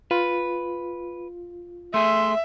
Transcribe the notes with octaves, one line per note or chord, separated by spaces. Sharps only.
F4 B4
A3 G#4 E5 C6